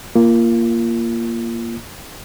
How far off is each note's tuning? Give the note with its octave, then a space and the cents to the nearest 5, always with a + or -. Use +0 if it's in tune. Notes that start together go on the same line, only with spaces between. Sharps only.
A#3 +5 F4 -25